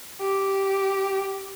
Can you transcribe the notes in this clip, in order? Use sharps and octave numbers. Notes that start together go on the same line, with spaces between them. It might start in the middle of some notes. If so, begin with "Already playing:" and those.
G4